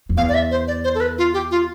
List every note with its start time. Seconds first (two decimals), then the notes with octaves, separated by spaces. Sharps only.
0.09 F2
0.17 E2 F5
0.29 D5
0.34 E5
0.51 C5
0.67 D5
0.84 C5
0.95 A4
1.00 B4
1.18 F4
1.34 G4
1.51 F4